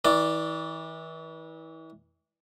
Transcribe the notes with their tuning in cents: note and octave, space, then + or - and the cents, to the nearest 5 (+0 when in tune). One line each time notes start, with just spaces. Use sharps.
E3 -35 D5 +0